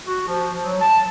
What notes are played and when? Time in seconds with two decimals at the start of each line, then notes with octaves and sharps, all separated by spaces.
0.05 F#4
0.27 F3
0.62 F#3
0.81 A5